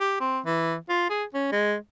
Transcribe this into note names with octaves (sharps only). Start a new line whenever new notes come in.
G4
C4
E3
F4
G#4
C#4
G#3